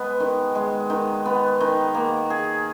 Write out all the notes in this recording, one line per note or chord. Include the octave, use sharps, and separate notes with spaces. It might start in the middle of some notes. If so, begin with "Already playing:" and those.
Already playing: G#3 B3
D#3
G#3
D#3
B3
D#3
A#3
G#4